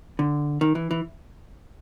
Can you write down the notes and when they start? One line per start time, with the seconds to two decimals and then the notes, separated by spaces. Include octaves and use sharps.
0.19 D3
0.61 D#3
0.75 E3
0.91 E3